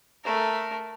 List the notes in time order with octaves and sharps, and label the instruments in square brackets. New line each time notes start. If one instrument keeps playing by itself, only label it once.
[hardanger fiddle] A3 A#4